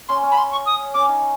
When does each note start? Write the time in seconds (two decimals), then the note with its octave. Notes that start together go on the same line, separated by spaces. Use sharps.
0.08 C#4 C6
0.23 C#4
0.31 B5
0.37 C6
0.51 C#6
0.66 D#6
0.94 C#4 D6
1.09 D#4